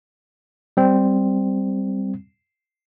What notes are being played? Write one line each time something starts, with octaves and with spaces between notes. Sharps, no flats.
G3 C4